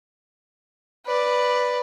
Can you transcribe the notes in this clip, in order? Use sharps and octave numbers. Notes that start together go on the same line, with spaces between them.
B4 D5